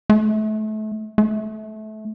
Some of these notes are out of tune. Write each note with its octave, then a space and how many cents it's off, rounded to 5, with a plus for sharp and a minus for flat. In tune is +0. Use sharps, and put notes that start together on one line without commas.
A3 -30
A3 -25